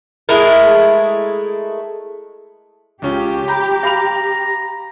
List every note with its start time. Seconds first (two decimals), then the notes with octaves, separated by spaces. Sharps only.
0.29 G#3 A3 E4 A#4
3.02 C#2 C#4 F4 G4
3.48 G5 A#5 B5
3.83 F5 A#5 B5 F7